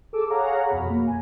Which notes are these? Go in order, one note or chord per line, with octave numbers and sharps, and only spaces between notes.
G#4 A4 D6 E6
G#4 C#5 F5 F#5 A#5
F2 B2 B5
A#3
G#5